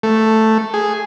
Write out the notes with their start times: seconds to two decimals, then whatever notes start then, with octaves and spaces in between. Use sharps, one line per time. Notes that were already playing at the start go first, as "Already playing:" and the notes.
0.03 A3
0.74 G#4